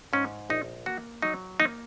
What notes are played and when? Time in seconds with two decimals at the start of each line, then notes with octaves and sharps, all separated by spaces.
0.13 G#2 C#4
0.50 A#1 D#4
0.86 A#3 F#4
1.22 F#3 D#4
1.60 A#3 D#4